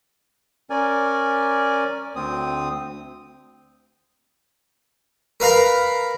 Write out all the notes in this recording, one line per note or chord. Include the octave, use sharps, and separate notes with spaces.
C#4 A#4 D5 G#5
D2 C4 D#6
A#4 B4 F5 A#5 B5